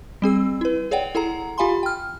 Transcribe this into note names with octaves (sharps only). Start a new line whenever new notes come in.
G3 C4 G#4 E6
E4 B4
G#4 C#5 D5 F#5 G5
E4 G#4 A4 F#5 A#5
F4 G4 F5 G#5 B5 C6
G5 F6